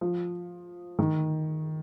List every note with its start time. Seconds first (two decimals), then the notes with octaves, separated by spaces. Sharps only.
0.01 F3
0.99 D#3